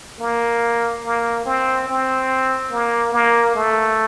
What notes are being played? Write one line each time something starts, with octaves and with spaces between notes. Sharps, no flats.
A#3
A#3
C4
C4
A#3
A#3
A3